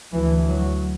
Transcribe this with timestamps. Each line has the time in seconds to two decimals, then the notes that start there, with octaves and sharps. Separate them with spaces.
0.12 D2 E3
0.47 F#3